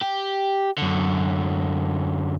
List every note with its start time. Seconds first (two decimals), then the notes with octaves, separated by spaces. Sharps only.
0.02 G4
0.78 F#2 D3